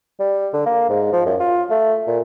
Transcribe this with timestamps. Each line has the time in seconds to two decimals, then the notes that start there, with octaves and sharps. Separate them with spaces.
0.20 G3
0.54 D3
0.66 A#3
0.90 G#2
1.13 F3
1.26 F#2
1.40 F4
1.70 A3
2.07 A#2